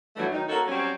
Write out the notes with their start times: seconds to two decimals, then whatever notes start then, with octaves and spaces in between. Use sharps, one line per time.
0.16 G2 E3 F#3 G3 A3
0.30 D#3 F#3 D#4
0.47 A#3 C#4 F#4 A4
0.67 F#3 G3 C4 C#4